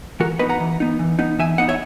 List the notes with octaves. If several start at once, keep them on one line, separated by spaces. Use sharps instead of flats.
E3 F#4 A#4
B3 D#4 B4 D#5
F#5 A#5
E3
B3 D#4
E3
B3 D#4
E3 E5 G#5
B3 D#4 D#5 F#5
C#5 E5